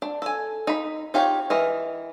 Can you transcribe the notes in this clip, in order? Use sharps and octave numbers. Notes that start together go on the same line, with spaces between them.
D4
A4 G#5
D#4 B5
D#4 F4 G4 C#5
E3 A#4 D#5